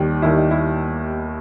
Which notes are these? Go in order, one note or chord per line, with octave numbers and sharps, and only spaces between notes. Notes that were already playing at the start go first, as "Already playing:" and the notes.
Already playing: D#2 D#3 G3 G4
D#2 D#3 G3 E4
D#4
E4